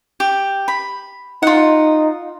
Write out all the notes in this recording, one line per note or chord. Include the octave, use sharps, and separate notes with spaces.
G4
B5
D#4 F4 F#5